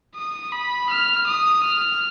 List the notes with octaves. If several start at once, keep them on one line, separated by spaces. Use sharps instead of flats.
D#6
B5
F6
D#6
F6